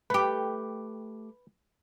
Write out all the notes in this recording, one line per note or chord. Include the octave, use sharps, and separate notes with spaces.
A3 G4 B4